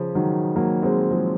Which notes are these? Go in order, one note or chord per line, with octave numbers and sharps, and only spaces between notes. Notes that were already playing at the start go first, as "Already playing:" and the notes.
Already playing: C#3 F3
D#3 F#3
F#3 A#3
G#3 C4
F3 G#3